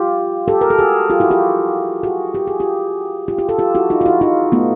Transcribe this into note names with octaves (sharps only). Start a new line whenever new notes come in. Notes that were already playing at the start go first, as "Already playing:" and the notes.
Already playing: F4 G4
G4 A4
A#4
A4
F#4 G#4
F4 G4
E4 F#4
F4 G4
F#4 G#4
G4
G#4
F4 G4
F4 G4
F4 G4
G4 A4
F4 G4
E4 F#4
D#4 F4
F4
E4 F#4
D#4 F4
A3 B3